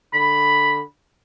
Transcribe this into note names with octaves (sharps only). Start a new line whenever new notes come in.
D3 B5